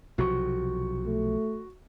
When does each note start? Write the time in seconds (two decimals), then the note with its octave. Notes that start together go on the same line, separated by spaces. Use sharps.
0.18 B1 C3 F3 F#4 C#6
1.06 A3